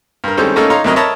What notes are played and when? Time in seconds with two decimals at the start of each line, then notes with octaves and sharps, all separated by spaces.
0.24 G2 A#4
0.37 D#3 G3 G#3 C4 C#4 A4
0.56 A3 A#3 C#4 D#4 A4
0.70 D#4 C#5 F5 A#5 C6
0.84 D2 C3 F#3 A#4 D#5
0.96 A#4 C#5 D#5 E5 A5 B5